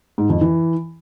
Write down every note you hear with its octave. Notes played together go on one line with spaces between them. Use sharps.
G#2
F2
E3